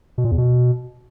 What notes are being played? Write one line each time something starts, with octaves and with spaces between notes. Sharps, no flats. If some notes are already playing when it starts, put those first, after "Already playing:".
B2
A#2
E2
B2